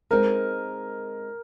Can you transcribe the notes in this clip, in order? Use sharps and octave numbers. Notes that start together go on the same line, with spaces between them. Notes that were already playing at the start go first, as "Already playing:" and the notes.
G#3 C4 D#4 A#4